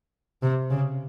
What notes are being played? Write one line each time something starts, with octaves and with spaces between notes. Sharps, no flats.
C3
C#3